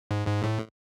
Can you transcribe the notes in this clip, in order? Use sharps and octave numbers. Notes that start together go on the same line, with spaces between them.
G#2
G#2
A2